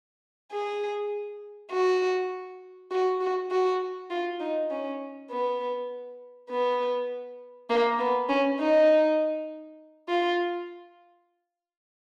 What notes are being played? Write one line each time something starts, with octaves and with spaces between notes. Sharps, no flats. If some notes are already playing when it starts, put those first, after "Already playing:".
G#4
F#4
F#4
F#4
F#4
F4
D#4
C#4
B3
B3
A#3
B3
C#4
D#4
F4